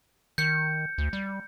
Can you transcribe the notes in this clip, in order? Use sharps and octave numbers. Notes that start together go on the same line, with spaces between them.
D#3 G6 C#7
D2
G3